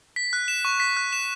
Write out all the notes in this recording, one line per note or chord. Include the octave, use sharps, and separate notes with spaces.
B6
F#6
E7
C#6
B6
F#6
E7